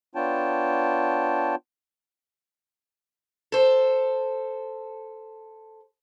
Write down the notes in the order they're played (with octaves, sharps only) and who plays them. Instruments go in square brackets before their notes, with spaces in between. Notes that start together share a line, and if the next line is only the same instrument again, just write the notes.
[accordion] B3 D4 F4 C#5 G5 A5
[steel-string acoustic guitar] A4 C5